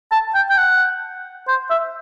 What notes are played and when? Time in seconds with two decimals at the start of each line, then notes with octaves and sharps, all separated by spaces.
0.12 A5
0.35 G5
0.50 G5
0.57 F#5
1.48 C5
1.70 E5